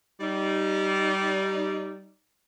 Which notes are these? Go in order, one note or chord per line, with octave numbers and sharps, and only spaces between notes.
G3 D#4